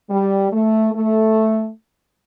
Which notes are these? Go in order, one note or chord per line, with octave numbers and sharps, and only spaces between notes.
G3
A3
A3